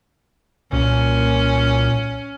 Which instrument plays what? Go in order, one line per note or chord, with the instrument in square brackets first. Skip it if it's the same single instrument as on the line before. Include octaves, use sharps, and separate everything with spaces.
[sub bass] C2 [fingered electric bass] A#2 A#3 [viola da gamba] C#4